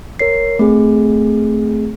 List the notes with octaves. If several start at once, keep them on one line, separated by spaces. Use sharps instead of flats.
A#4 C#5 C7
A3 C4 G#4